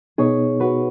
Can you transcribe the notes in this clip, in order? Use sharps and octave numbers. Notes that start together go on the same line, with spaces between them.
B2 B3 D#4 G#4 C#5
F#4 B4